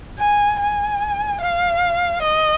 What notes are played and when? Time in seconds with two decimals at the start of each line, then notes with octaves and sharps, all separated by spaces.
0.19 G#5
0.60 G#5
1.41 F5
2.22 D#5